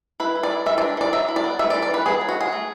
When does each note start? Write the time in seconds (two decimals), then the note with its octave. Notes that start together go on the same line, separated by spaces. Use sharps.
0.20 E4 B4
0.35 E4
0.43 D5
0.50 E4
0.66 E3 E5
0.78 D5
0.82 D4
0.97 E3 D5
1.13 F#3 E5
1.29 E4
1.36 D5
1.44 B3
1.59 A3 E5
1.70 D5
1.74 E3
1.82 D5
1.90 E3 B4
2.06 B3 G#4
2.21 F#3
2.29 F#4
2.37 F#3 G#4
2.52 A3